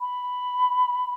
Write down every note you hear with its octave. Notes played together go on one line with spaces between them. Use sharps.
B5